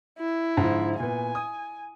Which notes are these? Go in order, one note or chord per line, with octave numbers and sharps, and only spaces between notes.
E4
G#2 D3 F3
A#2 B3 G#5
D#6